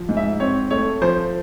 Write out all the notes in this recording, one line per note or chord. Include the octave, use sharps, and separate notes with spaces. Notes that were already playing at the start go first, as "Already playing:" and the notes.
Already playing: F3
G#2
E5
C4 C#5
A3 C#5
F3 C5